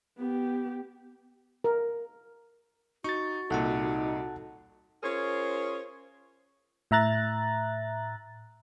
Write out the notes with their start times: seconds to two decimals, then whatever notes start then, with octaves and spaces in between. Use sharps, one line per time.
0.18 B3 G4
1.64 A#4
3.04 D#4 F#4 C#6 A6
3.50 C2 A#2 D#4 A4 F#5 A5
5.03 C#4 F4 G#4 A#4 C5 C#5
6.91 A2 E5 A#5 F#6 A6